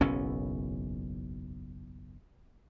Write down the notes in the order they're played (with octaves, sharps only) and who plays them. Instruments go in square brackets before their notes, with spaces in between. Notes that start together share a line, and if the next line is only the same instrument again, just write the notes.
[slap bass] F#1 B1 E2 C#4